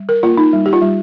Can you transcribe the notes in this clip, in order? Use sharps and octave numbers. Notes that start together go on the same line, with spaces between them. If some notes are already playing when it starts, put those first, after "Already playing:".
Already playing: G3
A#4
A#3 F4
D#4
G3
G4
F4
G3